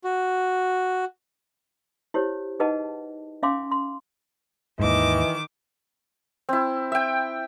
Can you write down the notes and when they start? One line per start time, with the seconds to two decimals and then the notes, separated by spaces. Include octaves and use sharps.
0.04 F#4
2.14 E4 G4 C5 C#5
2.60 D#4 G#4 B4 D#5 F#5 A5
3.43 C#4 E5 F5 G#5 C6 D6
3.71 C6
4.80 D#2 G#2 D#3 E3 D#5 D6
6.49 C4 E4
6.92 E5 G5